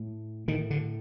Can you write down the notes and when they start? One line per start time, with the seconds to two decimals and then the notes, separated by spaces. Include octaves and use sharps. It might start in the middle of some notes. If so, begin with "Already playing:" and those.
Already playing: A2
0.48 A2 D#3
0.70 D3